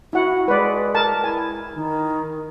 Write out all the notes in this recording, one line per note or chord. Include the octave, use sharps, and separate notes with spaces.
E4 F#4 F#5
G#3 B4 D5
A#4 A5
E4 G#5
D#3